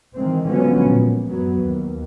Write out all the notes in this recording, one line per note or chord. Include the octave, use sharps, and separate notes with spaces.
D#3 E3 G#3 C4
D3 F3 F#3 G#3 B3 C#4
A#2
F#2 F#3 B3
D#2